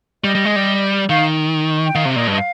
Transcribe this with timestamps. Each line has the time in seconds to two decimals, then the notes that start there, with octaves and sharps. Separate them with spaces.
0.24 G3 D#5
0.35 G3
0.45 G#3
0.56 G3
1.09 D#3 F5
1.86 G5
1.95 D#3 F5
2.05 C3
2.16 A#2 D#5
2.27 G2 D#5
2.38 F5